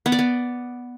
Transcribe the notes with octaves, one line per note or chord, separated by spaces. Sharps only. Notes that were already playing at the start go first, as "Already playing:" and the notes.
B3
D5
B3